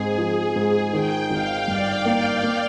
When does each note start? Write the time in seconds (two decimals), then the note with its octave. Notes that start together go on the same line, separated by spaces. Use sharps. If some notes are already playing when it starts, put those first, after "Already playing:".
Already playing: G#2 C4 G#4
0.18 F3
0.56 G#2
0.93 D#3 G5
1.30 G#1 F5
1.67 G2 D5
2.05 A#3
2.43 A#3